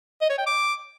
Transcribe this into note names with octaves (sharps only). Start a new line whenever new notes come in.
D#5
C#5
G5
D6